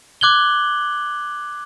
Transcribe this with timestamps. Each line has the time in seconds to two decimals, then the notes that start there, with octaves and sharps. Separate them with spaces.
0.21 D6 F#6 G#6 F#7 G7